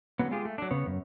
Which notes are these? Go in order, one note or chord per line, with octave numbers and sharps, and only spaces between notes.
D3 F#3 B3
G#3 F4 G4 G#4
A3
F#3 D4
C#3 B3 C#5
F#2